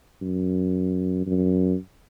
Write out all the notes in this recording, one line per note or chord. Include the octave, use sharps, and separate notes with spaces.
F#2
F#2